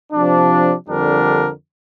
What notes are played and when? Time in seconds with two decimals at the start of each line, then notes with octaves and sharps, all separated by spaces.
0.12 C3 F3 D4
0.88 F2 D3 G3 D4 A#4